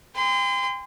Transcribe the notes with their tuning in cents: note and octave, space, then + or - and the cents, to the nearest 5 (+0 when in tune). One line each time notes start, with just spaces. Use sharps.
G5 +45 C6 -35